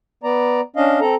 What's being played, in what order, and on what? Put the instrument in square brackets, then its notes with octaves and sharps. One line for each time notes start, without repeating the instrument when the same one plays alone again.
[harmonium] B3 D5 A#5
C#4 D4 D#5 F5
C4 A4 A#5